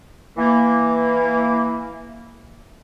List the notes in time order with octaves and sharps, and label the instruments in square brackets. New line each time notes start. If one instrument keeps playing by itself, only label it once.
[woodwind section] E3 A#3